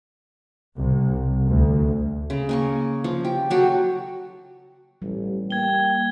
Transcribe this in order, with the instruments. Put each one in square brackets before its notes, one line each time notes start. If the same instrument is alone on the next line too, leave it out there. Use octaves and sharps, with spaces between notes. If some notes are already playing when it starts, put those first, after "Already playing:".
[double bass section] C2
D2
[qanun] C#3
A#3 G#5 C#6
F3
G4
F#3 F#4 G4 A4
[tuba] A1 [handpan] G3
[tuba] A#3 [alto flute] G5 [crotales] G#6 G7